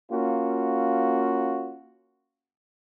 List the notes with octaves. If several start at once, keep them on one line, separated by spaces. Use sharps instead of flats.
A#3 C#4 F4 F#4